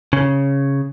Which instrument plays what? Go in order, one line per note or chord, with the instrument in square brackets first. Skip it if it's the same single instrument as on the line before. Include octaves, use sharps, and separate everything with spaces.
[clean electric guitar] C#3